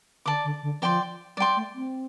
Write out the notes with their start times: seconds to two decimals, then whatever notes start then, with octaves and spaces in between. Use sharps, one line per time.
0.26 D3 D5 A5 D6
0.44 D3
0.63 D3
0.82 F3 D5 G5 C6
1.37 G3 D5
1.40 G5 C6
1.56 A3
1.75 C4